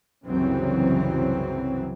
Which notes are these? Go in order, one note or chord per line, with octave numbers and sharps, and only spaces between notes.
C2 F#2 C#3 E3 F#3 C4